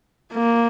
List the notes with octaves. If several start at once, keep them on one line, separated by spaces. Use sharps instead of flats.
A#3